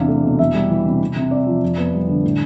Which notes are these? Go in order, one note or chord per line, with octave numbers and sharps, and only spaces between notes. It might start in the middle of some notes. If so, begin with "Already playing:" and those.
Already playing: E2 C3 D4 F5
A3
B2
E2 E5
G3
E3
C3
C3
C3
C4 D5
F3
F2
B3
G3
D3
A2